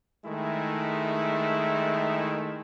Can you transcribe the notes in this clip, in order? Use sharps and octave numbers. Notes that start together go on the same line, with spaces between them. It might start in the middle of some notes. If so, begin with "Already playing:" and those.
D#3 G#3 A3 E4